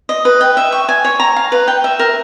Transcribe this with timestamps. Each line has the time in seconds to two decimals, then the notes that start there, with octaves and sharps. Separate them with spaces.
0.09 D#5
0.25 B4
0.41 G5
0.57 E5
0.72 C#6
0.89 G#5
1.05 C#5
1.20 A#5
1.36 F5
1.52 B4
1.68 G5
1.84 E5
1.99 A#4